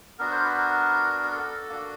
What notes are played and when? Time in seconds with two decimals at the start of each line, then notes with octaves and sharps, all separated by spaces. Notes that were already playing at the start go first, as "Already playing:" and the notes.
0.19 B3 D4 F#4 A#4
0.31 C5
0.44 B4
0.56 A#4
1.23 A#4
1.31 A4
1.69 A#3 D4 F#4